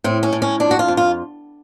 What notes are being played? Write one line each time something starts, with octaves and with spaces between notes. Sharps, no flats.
A2 C4
C#4
A2
C#4
F2 D4
F#4
F4
F2
F4